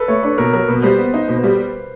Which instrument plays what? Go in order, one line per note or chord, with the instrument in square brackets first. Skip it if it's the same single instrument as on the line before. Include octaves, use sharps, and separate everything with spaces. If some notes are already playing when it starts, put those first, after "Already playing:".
Already playing: [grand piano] A4 B4
[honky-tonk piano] A3 [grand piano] C#5
[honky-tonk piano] D4 [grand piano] B4
[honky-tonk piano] B2 [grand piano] A#4
[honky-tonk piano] F#3 [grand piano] A#4
[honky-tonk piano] B2 [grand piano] B4
[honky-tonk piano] G3 [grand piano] C5
[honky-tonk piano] B3
[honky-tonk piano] D#4 [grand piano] C5
[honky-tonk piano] B2
[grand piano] B4
[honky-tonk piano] G3